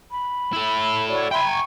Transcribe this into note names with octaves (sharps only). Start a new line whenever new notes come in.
B5
E4 A4
F#4 C#5 D5
E5 G5 G#5 B5 C6
A#5 C#6